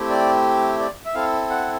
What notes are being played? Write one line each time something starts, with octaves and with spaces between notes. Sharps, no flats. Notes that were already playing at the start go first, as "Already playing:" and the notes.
Already playing: A3 C4 E4 G4
D5
D5
E5
C4 E4 A4 F5
F#5